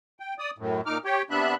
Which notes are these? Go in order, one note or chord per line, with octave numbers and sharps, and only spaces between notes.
G5
D5 D#6
F#2 A2
A#2 D#4 D6 F6
G4 C#5 G5
C3 B3 D4 E5 B5 F#6